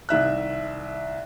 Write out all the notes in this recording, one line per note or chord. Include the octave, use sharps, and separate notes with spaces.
C2 D#3 E5 F#6